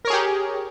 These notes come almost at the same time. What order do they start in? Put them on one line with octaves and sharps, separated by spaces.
A#4 C#5 G#4 G4